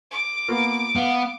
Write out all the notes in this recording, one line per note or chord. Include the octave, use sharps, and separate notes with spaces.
D6
A#3 B3 F4
B3 F5